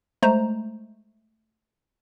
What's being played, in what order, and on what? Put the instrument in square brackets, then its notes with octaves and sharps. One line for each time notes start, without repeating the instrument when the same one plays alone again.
[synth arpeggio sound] G#3 A3 C5 A#5